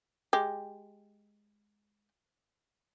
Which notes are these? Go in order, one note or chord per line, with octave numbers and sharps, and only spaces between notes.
G#3 G4